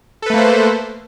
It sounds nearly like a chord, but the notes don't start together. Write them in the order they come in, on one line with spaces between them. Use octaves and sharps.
A4 B4 A3 A#3 C5